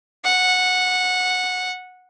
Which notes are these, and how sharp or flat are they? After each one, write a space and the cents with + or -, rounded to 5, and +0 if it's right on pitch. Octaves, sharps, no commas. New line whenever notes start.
F#5 -15